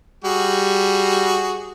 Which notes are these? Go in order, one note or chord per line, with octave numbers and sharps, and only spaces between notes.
G3 F#4 G#4